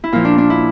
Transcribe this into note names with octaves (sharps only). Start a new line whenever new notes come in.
E4
A#2 F3 F4
D4
D4
E4